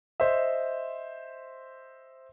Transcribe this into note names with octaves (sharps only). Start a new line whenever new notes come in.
C5 D#5 E5